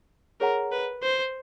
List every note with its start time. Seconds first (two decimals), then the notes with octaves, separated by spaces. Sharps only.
0.40 G#4 A#4 C#5 F#5 A#5
0.72 B4
1.03 C5